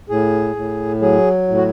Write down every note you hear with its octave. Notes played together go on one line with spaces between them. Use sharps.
A2 G#4
A2
F#3 G#4
A2
F#4